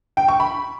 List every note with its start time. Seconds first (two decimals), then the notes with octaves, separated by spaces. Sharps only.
0.17 G5
0.28 C#6
0.40 B5